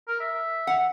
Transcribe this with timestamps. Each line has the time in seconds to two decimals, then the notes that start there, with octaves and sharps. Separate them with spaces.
0.07 A#4
0.20 E5
0.67 F#5